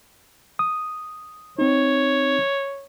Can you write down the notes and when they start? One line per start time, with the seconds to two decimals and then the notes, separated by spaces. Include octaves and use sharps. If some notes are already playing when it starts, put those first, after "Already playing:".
0.59 D#6
1.59 C4 D#4 C#5